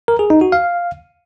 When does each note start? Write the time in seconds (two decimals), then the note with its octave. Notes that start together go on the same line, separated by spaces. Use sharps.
0.08 A#4
0.19 G#4
0.30 D#4
0.41 F#4
0.52 F5